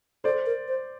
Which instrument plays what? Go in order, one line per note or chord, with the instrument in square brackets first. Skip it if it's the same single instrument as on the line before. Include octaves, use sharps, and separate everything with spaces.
[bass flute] A4 [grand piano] C5 D5
[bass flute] A#4
C5